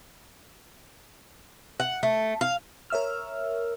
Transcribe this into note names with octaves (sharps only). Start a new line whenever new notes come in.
F#5
A3
F5
A#4 C#5 E5 E6 F6